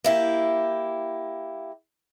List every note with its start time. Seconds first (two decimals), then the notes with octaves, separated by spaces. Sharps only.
0.04 A#3 E4 G4